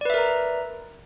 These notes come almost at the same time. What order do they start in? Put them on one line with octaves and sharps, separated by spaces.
D5 B4 E5 A#4 A#5